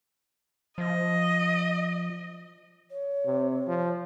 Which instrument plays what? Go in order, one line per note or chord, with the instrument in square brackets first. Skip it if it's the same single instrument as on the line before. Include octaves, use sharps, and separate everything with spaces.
[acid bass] F3 [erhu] D#5
[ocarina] C#5
[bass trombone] C3
F3